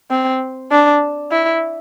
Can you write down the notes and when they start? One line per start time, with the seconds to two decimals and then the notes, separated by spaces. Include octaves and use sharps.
0.11 C4
0.72 D4
1.32 E4